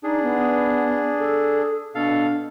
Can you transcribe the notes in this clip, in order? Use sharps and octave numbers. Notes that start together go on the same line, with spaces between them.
D4 D#4 G#4
B3
A4
B2 D4 A4 F5